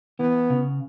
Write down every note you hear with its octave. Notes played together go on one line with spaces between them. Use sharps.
E3 B3
C#3